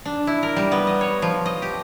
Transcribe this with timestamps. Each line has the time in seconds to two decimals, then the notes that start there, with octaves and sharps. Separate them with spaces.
0.05 D4
0.27 E4
0.43 A#4
0.56 G3
0.72 B3
0.87 D#5
1.01 C#5
1.22 F3
1.46 D#5
1.62 G4